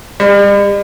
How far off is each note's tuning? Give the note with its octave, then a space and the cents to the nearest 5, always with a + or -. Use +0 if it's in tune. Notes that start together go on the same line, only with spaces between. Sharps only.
G3 +45